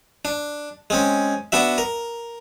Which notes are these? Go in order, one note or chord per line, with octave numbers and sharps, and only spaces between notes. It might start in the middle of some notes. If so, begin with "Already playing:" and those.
D4
G#3 C4 C#4
B3 D4 F#4 E5
A#4